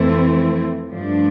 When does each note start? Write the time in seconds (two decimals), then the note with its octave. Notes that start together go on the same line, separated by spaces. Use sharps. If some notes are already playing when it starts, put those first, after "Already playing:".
Already playing: F2 E3 A3 C4 E4
0.91 G2 F3 A3 D4